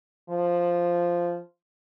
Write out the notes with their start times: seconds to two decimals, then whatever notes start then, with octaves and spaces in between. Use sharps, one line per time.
0.30 F3